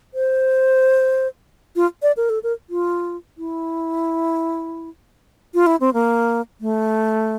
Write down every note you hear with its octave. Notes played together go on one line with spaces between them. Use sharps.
C5
F4
D5
A#4
A4
A#4
F4
E4
F4
E4
C4
A#3
A3